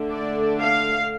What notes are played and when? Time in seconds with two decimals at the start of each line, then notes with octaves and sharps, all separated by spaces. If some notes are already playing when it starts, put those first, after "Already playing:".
Already playing: D3 A3 D4
0.11 D5
0.61 F5